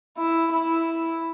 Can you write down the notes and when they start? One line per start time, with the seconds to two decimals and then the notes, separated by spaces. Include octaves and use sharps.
0.18 E4
0.52 E4